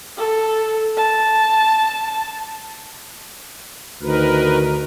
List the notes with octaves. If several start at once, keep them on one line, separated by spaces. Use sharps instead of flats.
A4
A5
D2 D#3 A#4 B4